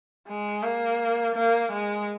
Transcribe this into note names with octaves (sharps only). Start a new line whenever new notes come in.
G#3
A#3
A#3
G#3